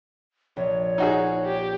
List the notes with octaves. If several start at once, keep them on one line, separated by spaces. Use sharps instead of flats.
A#1 C#5
D#4 F#4 G#4
G4